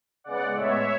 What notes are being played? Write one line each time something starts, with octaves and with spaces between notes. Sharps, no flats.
C#3 G#3 B3 D5 F#5
A2 G#3 B3 C#5 E5